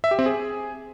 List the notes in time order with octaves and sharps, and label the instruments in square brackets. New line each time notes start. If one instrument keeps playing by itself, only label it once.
[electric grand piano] E5
G4
C4
G#4